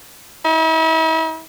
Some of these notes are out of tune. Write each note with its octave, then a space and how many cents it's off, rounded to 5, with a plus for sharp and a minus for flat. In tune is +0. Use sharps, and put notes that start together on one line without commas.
E4 -45